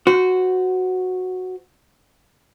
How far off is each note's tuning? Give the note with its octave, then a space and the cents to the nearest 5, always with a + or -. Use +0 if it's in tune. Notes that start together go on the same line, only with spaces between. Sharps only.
F#4 -5 C5 -25